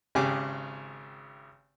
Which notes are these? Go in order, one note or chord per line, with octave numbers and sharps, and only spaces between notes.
G#1 C#3 G4 G#5 D6